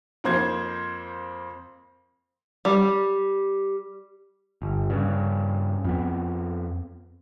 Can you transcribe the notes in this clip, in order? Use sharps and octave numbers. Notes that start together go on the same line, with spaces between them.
F2 A#3 C5 G#6
G3
G1
G2 C#3
F2 B3